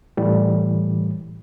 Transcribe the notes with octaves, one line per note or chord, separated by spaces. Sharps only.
A2 E3 G3